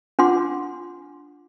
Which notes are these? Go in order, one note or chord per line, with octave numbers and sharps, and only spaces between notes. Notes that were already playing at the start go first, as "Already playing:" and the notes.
D4 F4 F#5 C6 D6